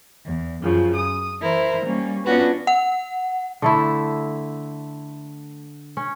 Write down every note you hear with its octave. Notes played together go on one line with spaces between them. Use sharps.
E2
F#2 C#3 F3
D#6
E3 E4 A#4 C5
G3 A#3 C#4
B3 C#4 D4 F4 F#4 B4
F#5
D3 A3 E4
C#4